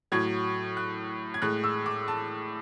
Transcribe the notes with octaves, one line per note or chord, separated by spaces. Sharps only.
A2 F#3 G#6
F#6
G#6
A2 G#3 F#6
E6
D6
A5